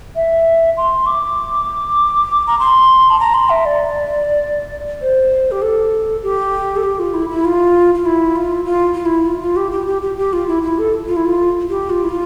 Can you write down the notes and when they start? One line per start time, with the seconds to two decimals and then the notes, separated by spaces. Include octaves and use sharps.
0.16 E5
0.77 C6
1.06 D6
2.47 A#5
2.59 C6
3.10 A5
3.20 A#5
3.34 C6
3.49 E5
3.65 D5
5.01 C5
5.51 G4
5.62 A4
6.23 G4
6.76 A4
6.83 G4
6.99 F4
7.14 E4
7.30 E4
7.45 F4
7.95 F4
8.05 E4
8.36 F4
8.65 F4
8.94 F4
9.05 E4
9.26 F4
9.41 F4
9.56 G4
9.72 G4
9.87 G4
10.02 G4
10.18 G4
10.33 F4
10.48 E4
10.63 E4
10.78 A4
11.08 F4
11.17 E4
11.26 F4
11.69 G4
11.90 F4
12.04 E4
12.09 F4